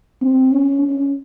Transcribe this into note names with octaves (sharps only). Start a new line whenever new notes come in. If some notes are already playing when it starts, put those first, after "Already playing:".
C4
C#4
C#4